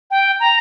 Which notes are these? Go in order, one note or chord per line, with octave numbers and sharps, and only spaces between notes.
G5
A#5